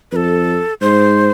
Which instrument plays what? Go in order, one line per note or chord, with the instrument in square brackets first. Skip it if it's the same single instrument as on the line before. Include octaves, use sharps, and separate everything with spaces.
[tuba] F2 [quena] A4 B4
[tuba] G#2 [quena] C5